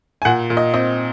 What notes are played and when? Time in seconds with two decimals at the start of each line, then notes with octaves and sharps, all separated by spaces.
0.22 G#5
0.25 A#2 F#5
0.50 A#2
0.57 D#5
0.73 C4 D#5